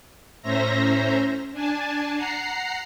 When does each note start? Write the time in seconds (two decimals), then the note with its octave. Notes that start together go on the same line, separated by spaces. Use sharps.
0.42 A2 C#4 C5 E5 A#5 A#6
1.52 D4 G#5 A5
2.16 F#5 A#5 C7